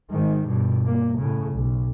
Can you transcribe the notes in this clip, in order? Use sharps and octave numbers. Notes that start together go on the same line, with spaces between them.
G#2 D#3
G2 B2
A#3
A2 C#3
B1